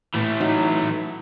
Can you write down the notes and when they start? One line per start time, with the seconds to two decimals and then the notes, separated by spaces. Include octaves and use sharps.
0.14 A2 E3 A3
0.40 F#3 D#4